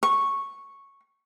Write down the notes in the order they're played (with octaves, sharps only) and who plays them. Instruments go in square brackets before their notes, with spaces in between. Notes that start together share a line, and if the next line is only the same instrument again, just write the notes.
[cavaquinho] C#6